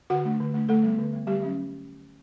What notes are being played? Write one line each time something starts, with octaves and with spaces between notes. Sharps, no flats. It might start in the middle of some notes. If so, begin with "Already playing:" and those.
D3 F#4 F#5
A3 D4
D3
A3 D4
D3 A3 A4
G3 B3
D3
G3 B3
D3 G3 G4
F#3 C#4